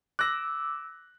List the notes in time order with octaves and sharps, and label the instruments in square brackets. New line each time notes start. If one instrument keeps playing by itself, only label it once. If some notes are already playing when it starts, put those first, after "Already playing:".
[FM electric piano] D6 E6 [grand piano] F#6 A#6